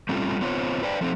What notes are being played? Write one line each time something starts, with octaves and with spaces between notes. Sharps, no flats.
G3 A3 C4 C#4 F4
B3 C4 F4 C5 C#5
B4 C5 D5 G5
F3 A3 C4 D4 D#4